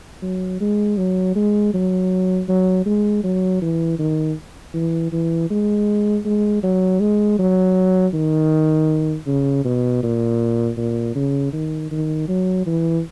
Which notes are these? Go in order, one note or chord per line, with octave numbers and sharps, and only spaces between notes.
F#3
G#3
F#3
G#3
F#3
F#3
G#3
F#3
E3
D#3
E3
E3
G#3
G#3
F#3
G#3
F#3
D#3
C#3
B2
A#2
A#2
C#3
D#3
D#3
F#3
E3